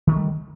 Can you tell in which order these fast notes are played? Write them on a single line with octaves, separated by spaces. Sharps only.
D#3 A3 G3